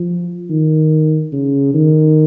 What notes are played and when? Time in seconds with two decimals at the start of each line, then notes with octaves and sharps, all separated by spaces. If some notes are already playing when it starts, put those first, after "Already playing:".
Already playing: F3
0.50 D#3
1.32 C#3
1.74 D#3